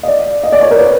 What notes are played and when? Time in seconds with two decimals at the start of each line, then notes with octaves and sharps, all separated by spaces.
0.03 D#5
0.07 D5
0.43 D#5
0.52 D5
0.61 C#5
0.71 A#4
0.79 B4